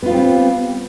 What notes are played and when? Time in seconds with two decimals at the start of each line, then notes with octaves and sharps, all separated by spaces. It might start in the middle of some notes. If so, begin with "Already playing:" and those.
0.02 B3
0.06 F4
0.10 G3
0.13 C4